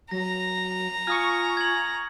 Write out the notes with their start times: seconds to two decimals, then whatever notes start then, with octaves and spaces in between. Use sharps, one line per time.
0.11 F#3 A#5 A#6
1.07 F4 G#5 C#6 D#6 F6
1.57 G#6 F#7